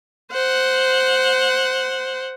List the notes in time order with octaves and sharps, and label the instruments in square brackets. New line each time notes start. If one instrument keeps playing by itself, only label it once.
[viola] C5 F#5